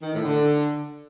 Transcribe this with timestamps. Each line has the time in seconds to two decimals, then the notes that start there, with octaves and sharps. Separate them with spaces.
0.02 D#3
0.13 A2
0.24 D3